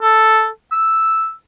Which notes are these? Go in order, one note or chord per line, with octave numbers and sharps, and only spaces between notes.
A4
E6